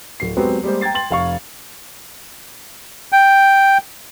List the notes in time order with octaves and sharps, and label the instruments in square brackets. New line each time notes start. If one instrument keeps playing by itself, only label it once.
[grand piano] D1 C7
F#3 G#3 B3 C4 G4
G3 G#3 A#3 C5
G5 A#5 G#6 A6 C7
G5 C6 A6 F#7
F1 F5 C#6
[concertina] G5